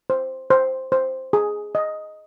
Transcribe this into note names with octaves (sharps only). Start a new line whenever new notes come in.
C5
C5
C5
G#4
D#5